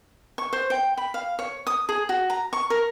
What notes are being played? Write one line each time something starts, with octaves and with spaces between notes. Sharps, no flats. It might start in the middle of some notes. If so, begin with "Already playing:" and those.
C#6
C5
G5
B5
F5
C#5
D#6
G#4
F#4
A#5
C#6
A#4